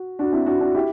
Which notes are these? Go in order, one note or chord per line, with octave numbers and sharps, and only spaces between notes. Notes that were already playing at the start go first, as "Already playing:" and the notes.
Already playing: F#4
D4 F#4
C4 E4
D4 F#4
D4 F#4
E4 G4